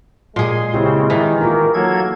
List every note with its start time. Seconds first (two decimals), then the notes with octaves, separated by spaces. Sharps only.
0.36 A#2 G#3 G#4 C6
0.74 C#3 C4 E4 G4
1.10 D#3 E3
1.40 A#3 D#4 F4
1.74 F#3 A#3 A4 G#6